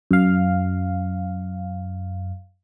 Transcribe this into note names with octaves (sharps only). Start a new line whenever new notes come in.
F#2 F5